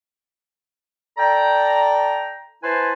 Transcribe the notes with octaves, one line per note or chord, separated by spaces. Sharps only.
A4 D5 G5 A#5
E4 B4 C5 G#5 A5 C6